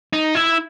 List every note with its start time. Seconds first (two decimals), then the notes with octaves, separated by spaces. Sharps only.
0.13 D#4
0.35 E4